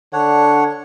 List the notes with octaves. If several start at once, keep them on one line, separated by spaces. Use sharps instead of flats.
D3 D4 C#5 F#5